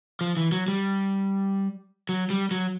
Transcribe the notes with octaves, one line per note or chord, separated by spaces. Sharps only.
F3
E3
F#3
G3
F#3
G3
F#3